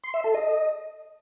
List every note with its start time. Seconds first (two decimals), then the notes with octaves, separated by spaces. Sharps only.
0.04 C6
0.14 E5
0.24 A4
0.34 D#5